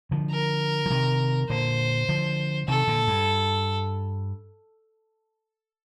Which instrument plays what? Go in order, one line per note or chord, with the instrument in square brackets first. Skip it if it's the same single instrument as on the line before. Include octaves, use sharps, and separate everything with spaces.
[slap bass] D3 F3
[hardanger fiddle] A#4
[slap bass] F3
C3 D#3
[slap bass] A#2 D3 [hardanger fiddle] C5
[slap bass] D3 F3
[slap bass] C3 D#3 [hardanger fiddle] A4
[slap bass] A#2 D3
G2